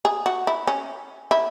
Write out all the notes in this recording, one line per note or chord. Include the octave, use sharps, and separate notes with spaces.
G#4
F#4
E4
C#4
E4